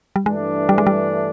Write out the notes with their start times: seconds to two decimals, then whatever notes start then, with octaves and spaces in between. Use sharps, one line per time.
0.16 G3
0.25 G2 E3 G#3 A3 D4
0.69 G3
0.78 G#3
0.87 G3